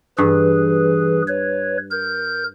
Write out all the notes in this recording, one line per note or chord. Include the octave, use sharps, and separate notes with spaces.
G2 E3 G#4 B4
B4 C#5
A#4 G6